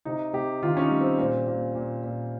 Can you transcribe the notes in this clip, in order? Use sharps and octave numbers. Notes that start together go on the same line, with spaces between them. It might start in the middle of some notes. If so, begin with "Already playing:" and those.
C3 D#4
C3 G4
D#3 F4
C#4
D#4
G3
C4
A#2 C4
A#2
A#2
A#2